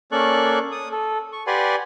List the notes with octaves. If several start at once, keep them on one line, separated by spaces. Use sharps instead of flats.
A#3 C#4 A4 D5 C#6 F#6
D#6
A4
C#6
G4 B4 D5 F#5 G#5 C6